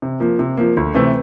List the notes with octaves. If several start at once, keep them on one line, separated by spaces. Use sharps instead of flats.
C3
F3 A#3
C3
F3 A#3
D2
C3 E3 A3 C4